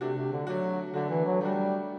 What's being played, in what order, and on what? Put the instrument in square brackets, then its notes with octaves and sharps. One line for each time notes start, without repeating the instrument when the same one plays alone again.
[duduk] C3 [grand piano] A3 D4 F#4
[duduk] C3
D3
[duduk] F#3 [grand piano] A3 D4 F#4
[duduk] D3 [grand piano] A3 D4 F#4
[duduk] E3
F#3
[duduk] G3 [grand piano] A3 D4 F#4